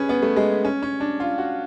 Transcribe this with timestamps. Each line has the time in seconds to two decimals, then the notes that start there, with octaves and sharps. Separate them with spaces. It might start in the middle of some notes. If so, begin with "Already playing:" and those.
Already playing: C#4 G#4 B4
0.09 B3
0.22 A3
0.36 G#3
0.65 C#4
0.83 C#4
1.00 D4
1.20 F4
1.38 F#4